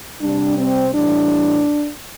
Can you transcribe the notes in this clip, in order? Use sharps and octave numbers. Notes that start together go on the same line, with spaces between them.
C3 G3 D4
C4
A2 E3 G3 D4